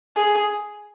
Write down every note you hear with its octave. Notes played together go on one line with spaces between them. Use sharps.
G#4